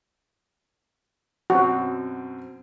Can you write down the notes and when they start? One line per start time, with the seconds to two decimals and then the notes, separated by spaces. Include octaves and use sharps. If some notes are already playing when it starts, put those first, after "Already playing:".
1.50 F#2 B2 C4 F#4